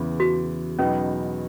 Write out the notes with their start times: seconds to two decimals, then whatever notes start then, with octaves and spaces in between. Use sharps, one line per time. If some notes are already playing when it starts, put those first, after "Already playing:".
Already playing: E2 C#3 E3 B3 E4
0.20 F#4
0.79 E2 B2 F#3 B3 C#4 D#4